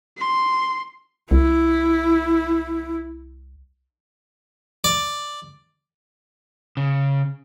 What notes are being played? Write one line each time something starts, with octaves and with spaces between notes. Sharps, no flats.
C6
C2 E4
D5
C#3